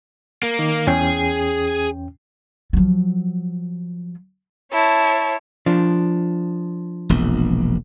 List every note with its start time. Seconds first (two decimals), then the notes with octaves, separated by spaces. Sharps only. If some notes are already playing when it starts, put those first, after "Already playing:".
0.43 A#3
0.59 D#3
0.87 E2 C#4 G#4 G5
2.73 F3 F#3
4.73 E4 C#5 A5
5.66 F3 D4
7.09 E1 A#1